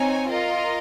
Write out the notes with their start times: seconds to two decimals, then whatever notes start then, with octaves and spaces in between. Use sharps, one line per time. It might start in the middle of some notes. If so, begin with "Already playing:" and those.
Already playing: C4 D#4 C#5 G#5
0.28 F4 A#4 D#5